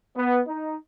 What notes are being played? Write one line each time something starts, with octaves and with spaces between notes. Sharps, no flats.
B3
D#4